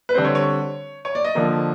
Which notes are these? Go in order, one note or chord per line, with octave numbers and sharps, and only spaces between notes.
B4
D3 G3 C4 C5
C#5
C#5
C#5
D5
D#5
D3 F3 A#3